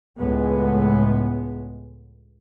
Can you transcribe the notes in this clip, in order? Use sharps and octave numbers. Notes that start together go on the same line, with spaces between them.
C#2 A2 G#3 B3